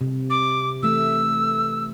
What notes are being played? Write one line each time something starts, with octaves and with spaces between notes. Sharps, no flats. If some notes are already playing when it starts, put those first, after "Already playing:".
C3
D6
E3 A3 E6